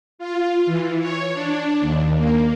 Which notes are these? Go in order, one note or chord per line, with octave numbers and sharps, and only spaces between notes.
F4
E3
C#5
D4
D#2
A#3